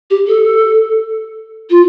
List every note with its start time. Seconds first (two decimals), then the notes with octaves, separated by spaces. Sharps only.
0.11 G4
0.28 A4
1.70 F4